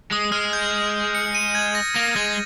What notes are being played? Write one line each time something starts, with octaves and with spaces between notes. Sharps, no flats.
G#3 D#6
G#3 F6
G6
C#7
D#7
G#6
A#6
A#3 A#6
G#3 G#6